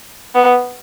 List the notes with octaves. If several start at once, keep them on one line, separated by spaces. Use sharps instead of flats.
B3